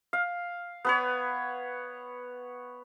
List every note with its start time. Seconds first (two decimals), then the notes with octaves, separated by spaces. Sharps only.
0.13 F5
0.85 B3 B4 C#5